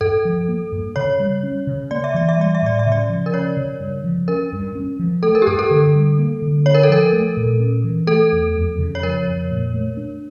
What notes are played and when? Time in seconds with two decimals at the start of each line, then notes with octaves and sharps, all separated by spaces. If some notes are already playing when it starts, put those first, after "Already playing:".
0.01 G2 A4
0.25 F3
0.48 A#3
0.72 G2
0.96 C#3 C#5
1.19 G3
1.43 C#4
1.67 C#3
1.91 A#3 D5
2.04 E5
2.14 E3 D5
2.29 E5
2.38 G3 D5
2.55 E5
2.62 A2 D5
2.79 E5
2.86 C#3
2.92 D5
3.09 F3
3.26 A#4
3.34 C#4 C#5
3.57 C#3
3.80 G2
4.04 F3
4.28 C#4 A#4
4.52 G2
4.75 C#4
4.99 F3
5.23 A3 A4
5.35 A#4
5.42 G4
5.47 G2 A4
5.59 A4
5.71 D3
5.95 G3
6.19 A#3
6.42 D3
6.66 D4 C#5
6.74 A#4
6.83 A4
6.89 F3 A#4
7.13 A3
7.37 A#2
7.60 C#4
7.84 E3
8.07 A3 A4
8.32 E2
8.56 F2
8.78 C#3
8.95 C#5
9.03 F3 A#4
9.26 F2
9.51 A#2
9.74 A3
9.97 D4